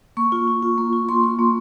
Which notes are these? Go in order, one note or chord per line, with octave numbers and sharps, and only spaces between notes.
A#3 C#6
F4
F4
F4
A#3
F4
A#3 C6
F4
A#3